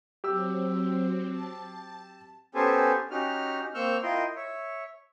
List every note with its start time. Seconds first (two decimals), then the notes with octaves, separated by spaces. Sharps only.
0.24 F#3 C4 G4 E6
1.30 A5
2.55 B3 C#4 G4 A4 C5 G#5
3.11 C#4 D#4 F#4 G4 F6
3.75 A#3 C4 C#6 E6 F6 G6
4.02 E4 F4 A#4 D#5 G5 C6
4.36 C#5 E5